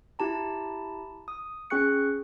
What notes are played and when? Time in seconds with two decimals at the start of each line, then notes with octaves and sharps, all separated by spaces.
0.19 E4 G4 A5 A#5
1.28 D#6
1.70 C#4 G#4 G5 C#6 F#6 C#7